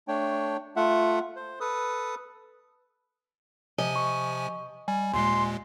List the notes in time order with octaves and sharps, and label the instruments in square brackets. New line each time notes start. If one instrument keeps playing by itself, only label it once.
[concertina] A3 D4 C#5 G5
A3 F4 E5 F#5
C5
A4 B4 D#6
[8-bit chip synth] C3 F3 G#5 [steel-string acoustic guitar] D#5
[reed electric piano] C#6
[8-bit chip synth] G3 [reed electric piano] G#5
[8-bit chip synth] D#2 A#2 G#3 [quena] C6